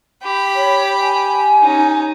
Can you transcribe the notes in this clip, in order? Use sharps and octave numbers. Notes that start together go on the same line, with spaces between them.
G4 B5
C#5
G#5
C#4 D#4